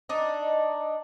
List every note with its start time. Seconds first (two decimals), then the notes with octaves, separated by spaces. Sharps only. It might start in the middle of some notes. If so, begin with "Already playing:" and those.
0.09 D4 D#4